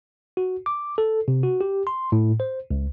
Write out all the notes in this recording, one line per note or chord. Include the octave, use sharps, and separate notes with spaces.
F#4
D6
A4
C3
F#4
G4
C6
A2
C5
C#2